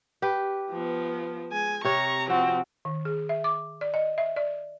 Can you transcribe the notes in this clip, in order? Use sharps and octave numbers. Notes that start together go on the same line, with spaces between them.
G4 B4
F3 B3
G#3 G#5
C3 C#5 A#5 C#6
F3 C4 F#4
D#3
G#4
E5
D6
D5
D#5
E5
D5